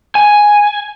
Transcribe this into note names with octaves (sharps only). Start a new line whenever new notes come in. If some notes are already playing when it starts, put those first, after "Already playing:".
G#5